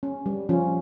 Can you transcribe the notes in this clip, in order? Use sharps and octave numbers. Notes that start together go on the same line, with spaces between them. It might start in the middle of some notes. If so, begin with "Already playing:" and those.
C#4
G3
F3 C#4 F4